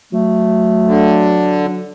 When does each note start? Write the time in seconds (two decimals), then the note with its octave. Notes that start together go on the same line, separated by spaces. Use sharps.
0.13 F#3 A3
0.87 D3